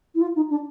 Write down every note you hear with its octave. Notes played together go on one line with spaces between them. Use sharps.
E4
F4
D#4
D4